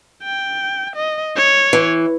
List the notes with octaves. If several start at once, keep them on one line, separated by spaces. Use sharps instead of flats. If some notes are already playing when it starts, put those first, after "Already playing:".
G5
D#5
C#5
E3